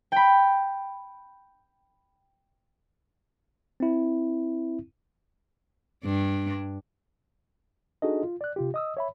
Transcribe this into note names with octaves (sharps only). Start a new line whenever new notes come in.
G5 B5
C4 E4
G2 D4
D4 D#4 F#4 G#4 A4 D#5
F4
D5 F#6
C3 F4 G4
D#5 D#6 E6
C#5 E5 B5